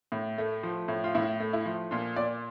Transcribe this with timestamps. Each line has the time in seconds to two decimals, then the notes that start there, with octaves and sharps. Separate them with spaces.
0.12 A2
0.38 A3
0.63 F3
0.88 A2
1.04 F4
1.15 A2 E4
1.40 A3
1.53 E4
1.65 F3
1.91 A#2 F4
2.16 A#2 D5